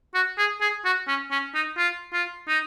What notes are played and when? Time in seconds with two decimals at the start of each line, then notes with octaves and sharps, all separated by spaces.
0.14 F#4
0.38 G#4
0.61 G#4
0.85 F#4
1.08 C#4
1.31 C#4
1.54 D#4
1.77 F4
2.13 F4
2.48 D#4